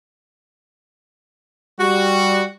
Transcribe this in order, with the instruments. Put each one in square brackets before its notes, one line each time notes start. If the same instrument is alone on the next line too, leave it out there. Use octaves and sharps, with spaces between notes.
[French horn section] G3 [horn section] F#4